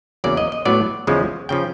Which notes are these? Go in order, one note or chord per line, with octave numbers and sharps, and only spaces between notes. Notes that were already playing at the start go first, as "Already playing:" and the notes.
E2 C#3 F#3 A#3 D5
D#5
D#5
A2 F#3 B3 D5
E2 C#3 F3 G#3
C#3 F3 G5